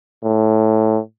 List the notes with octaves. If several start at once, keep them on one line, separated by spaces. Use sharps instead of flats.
A2